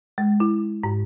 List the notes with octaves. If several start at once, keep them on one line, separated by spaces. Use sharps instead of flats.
G#3
E4
G#2